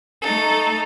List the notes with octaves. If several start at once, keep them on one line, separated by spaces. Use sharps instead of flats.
A3 D#4 A4